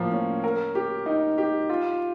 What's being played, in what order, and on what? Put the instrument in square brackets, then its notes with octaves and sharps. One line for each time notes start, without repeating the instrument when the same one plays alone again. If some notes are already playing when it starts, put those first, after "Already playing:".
Already playing: [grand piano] A2 F3 A#3
C#4
A#4
G4
D#4
G4
F4